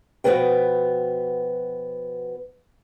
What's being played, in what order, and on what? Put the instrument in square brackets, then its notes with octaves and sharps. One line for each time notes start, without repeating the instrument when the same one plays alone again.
[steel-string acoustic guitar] B2 F3 B3 F#4 B4 G5